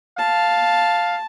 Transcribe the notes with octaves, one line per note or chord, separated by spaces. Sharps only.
F5 A5